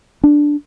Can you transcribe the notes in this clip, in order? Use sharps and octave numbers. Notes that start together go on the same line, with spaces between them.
D4